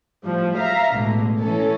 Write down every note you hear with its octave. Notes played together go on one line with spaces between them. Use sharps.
A2 F3 G3
E5 F5 A#5
A1 B2 D3 G#3
E3 C#4 A4